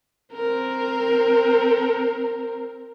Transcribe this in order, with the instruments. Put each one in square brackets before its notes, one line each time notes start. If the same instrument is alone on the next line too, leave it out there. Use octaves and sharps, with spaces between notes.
[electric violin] C4 A#4